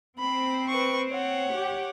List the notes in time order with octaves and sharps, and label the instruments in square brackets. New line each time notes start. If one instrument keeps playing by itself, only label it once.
[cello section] C4 [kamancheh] B5
[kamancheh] B4 C#6
C#5 F#5
[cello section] G4